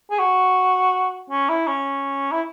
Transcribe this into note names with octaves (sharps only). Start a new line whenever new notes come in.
G#4
F#4
C#4
E4
C#4
E4